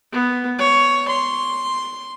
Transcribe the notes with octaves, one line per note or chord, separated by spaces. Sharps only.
B3
C#5
C6